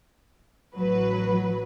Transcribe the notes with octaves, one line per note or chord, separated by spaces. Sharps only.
A1 F#3 B4